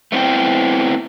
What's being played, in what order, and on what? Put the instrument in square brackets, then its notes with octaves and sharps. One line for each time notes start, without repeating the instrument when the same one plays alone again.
[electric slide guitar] A3 B3 C4 E4 G5